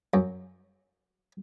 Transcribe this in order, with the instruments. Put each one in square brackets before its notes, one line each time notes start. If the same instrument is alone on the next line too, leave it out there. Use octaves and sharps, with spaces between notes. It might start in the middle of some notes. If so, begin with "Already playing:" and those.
[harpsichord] F#2